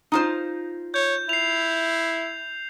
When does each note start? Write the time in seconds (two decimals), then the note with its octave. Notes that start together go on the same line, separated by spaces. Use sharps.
0.12 D#4 F4 C5
0.94 C#5 G6
1.29 E4 C7 F7